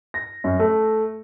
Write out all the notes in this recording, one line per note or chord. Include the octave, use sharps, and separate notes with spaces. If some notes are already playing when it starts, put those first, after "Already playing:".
A#6
F#2
A3